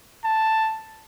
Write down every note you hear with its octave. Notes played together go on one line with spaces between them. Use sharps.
A5